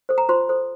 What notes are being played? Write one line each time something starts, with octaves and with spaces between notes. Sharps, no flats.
A4 C5
A#5
F4 C5 C6
A4 C5